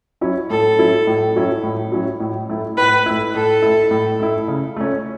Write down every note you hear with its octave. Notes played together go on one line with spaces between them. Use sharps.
F#3 C#4 E4
A2 A4
F#3 C#4 E4
A2
F#3 C#4 E4
A2
F#3 C#4 E4
A2
A3 E4
A2 B4
A3 E4
A2 A4
A3 E4
A2
A3 E4
C#3
A3 C#4